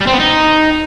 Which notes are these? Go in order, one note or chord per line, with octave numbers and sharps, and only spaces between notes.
G3
C4
B3
D#4